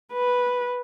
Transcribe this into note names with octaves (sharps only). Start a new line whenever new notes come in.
B4